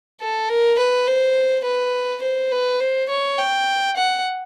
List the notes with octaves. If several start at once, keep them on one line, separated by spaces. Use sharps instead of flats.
A4
A#4
B4
C5
B4
C5
B4
C5
C#5
G5
F#5